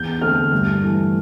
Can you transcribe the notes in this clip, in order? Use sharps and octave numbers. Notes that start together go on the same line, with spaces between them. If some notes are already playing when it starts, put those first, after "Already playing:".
Already playing: E2 G6
D3 A3 C4 F6
G2
E3 A3